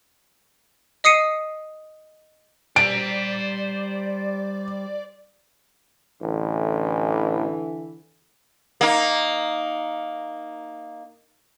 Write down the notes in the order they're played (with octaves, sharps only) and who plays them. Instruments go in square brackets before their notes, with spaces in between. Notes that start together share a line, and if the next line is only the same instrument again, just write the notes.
[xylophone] D#5 D#6 C7 C#7 D#7
[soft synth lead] G3 [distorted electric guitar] C5 A#5 [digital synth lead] D5 [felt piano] D7
[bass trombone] A1 [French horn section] D3 E3
[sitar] A#3 D#4